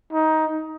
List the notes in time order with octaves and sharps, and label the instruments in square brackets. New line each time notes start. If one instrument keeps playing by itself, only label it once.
[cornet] D#4